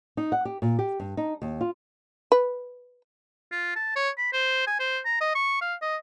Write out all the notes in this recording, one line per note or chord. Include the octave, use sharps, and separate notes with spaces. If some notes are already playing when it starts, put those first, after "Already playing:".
D#4
F#5
G4
A#2
G4
G2
D#4
D#2
F4
B4
F4
A5
C#5
B5
C5
G#5
C5
A#5
D#5
C#6
F5
D#5